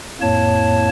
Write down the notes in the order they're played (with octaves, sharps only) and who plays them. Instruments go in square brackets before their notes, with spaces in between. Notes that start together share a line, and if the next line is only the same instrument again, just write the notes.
[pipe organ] F2 A2 A#3 C#5 A5